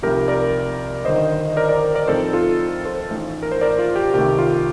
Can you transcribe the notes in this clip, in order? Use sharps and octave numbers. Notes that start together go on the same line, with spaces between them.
C2 C3 F3 A3 D#4 G4 A#4
A#4 D5
G1 G2 D#3 C5 D#5
A#4 D5
A#4 D5
A#4 D5
A2 F3 C4 D#4 A4 C5
F4 A4
A4 C5
A1 A2 A3 D#4
A#4
C5
A#4 D5
F4
G4
C2 C3 D#3 A3 G4
F4